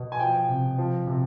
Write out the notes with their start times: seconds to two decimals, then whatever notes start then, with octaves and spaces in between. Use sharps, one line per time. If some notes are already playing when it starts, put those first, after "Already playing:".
Already playing: B2
0.12 G#5
0.19 F3 G5
0.49 C3
0.78 F3
1.07 C3